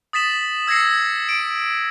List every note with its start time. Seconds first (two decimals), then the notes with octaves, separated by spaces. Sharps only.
0.13 D#6 A6 B6 E7 F#7
0.67 E6 G#6 A#6 C7 C#7
1.29 D7